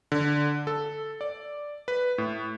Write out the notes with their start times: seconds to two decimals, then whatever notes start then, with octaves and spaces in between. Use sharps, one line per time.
0.12 D3
0.67 A4
1.21 D5
1.88 B4
2.18 A2